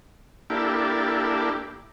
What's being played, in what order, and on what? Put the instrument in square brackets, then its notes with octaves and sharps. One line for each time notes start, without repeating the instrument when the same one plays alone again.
[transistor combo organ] A#3 D4 E4 G4 A4